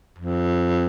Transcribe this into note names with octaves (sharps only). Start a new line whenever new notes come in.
F2